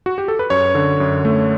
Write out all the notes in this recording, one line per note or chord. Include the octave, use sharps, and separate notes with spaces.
F#4
G4
A4
B4
F#2 C#5
D3
F#2
A3